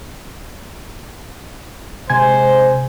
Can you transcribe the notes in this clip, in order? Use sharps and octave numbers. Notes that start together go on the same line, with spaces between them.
C3 G#3 C4 C5 G#5 G#6